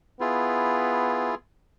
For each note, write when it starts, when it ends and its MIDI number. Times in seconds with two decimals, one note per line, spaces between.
0.20 1.33 59
0.20 1.35 64
0.20 1.35 65
0.20 1.35 68